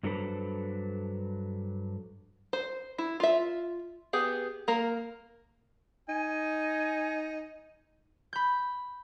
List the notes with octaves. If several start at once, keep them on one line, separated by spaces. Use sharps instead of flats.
G2 F#3 D4 A4 B4 C5
C5
E4
F4 E5
B3 G4 G#4
A#3 A#4
D#4 G#5
B5 G6